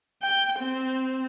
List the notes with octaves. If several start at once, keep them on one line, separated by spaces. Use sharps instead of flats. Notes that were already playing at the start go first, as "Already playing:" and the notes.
G5
C4